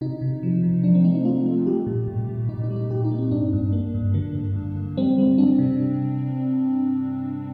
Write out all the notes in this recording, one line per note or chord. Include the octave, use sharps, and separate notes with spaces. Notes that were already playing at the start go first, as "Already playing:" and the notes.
C3 D#4
C3
F3
C3
F3 D4
C4
A3 D#4
D#4
A3 F4
A3
G3 G4
A#2
A#2
A#2
A#2 D#4
D#4
G3
D#4
A#2 G4
D#4
A#3
C4
G2 D4
G2
A#3
G2
D3 A#3
G2
G2
G2
G3 C4
G3
G3 D4
C3